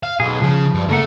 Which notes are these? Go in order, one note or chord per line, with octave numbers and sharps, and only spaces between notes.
F5
B1 G#4
C#3 F3 G#4
G2
C#3 A3 A#3 F#5